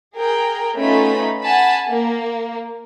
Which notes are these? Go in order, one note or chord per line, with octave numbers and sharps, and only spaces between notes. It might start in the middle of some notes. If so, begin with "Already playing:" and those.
G#4 A#4 G5
A3 B3 C#4 D#4 F4 B5
F#5 G#5 A5 B5
A#3